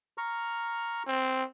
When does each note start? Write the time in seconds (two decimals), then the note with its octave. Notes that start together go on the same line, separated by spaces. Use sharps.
0.18 A#5 C#6 F6
1.07 C4